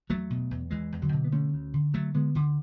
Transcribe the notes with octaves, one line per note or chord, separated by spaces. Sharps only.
E2 F#3 A3
B2
E2
E2 E3 G#3
E2
D3 F#3
B2
B3
D3 A3 C#4
D2
D3
D3 F#3 A3
D3 G#3 B3
D2 D3